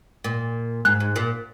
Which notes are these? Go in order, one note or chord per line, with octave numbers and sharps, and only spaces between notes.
A#2
G#2 F#6
G#2
A#2